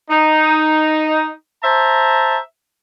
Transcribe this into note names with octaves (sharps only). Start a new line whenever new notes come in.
D#4
C5 E5 A5 A#5